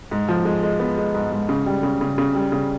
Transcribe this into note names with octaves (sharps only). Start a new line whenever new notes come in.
G#2
F3
G#3
G#3
B3
G#3
G#2
G#2
C#3
G3
C#3
C#3
C#3
G3
C#3